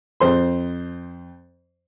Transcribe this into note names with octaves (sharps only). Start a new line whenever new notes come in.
F2 C5 C6